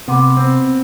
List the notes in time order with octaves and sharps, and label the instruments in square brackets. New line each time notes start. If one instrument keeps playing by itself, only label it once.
[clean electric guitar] C3 [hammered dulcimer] B3
[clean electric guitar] C4